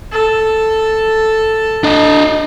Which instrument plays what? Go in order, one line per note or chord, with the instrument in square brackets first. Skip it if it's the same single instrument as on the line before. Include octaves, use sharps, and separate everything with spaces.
[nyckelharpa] A4
[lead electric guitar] D4 D#5